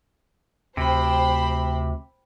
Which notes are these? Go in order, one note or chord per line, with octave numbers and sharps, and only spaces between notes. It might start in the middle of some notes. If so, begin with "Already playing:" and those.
D2 C3 C5 G5 B5